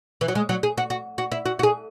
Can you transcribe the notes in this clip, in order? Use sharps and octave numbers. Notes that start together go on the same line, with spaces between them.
E3
F#3
G#3
F#3
G#4
F#4
F#4
F#4
E4
F#4
F#4
G#4